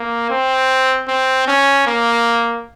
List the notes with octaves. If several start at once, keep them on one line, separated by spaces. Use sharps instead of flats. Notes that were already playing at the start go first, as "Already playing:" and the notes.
Already playing: A#3
C4
C4
C#4
A#3